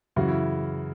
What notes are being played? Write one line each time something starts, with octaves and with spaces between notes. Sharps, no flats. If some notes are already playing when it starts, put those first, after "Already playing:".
F#2 C#3 E3 F#4
E4